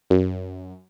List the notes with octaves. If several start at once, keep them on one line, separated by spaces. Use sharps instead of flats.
F#2